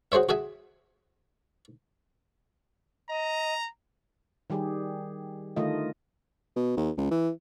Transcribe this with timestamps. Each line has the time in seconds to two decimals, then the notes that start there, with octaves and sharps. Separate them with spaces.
0.12 F#4 G#4 C5 C#5 E5
0.29 F#4 G#4 E5 G#5
3.09 D#5 A#5
4.50 D#3 G3 G4 G#4
5.56 D3 D#3 A3 F4 D#5
6.56 B2
6.77 D#2
6.98 C#2
7.11 E3